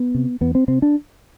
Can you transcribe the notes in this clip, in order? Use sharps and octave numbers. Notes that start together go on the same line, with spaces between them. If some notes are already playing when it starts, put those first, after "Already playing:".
Already playing: B3
C3
E2 B3
C4
C3 C4
D4